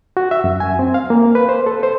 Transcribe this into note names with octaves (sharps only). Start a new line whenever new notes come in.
F#4
E5
F#2
G#5
C4
F5
A#3
B4
C5
A4
C5